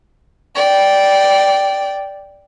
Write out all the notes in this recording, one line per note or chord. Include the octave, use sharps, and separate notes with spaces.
D5 G5